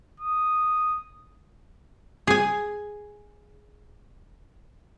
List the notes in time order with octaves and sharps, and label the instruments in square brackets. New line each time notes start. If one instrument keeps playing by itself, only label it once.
[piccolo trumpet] D#6
[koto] G#4 G#5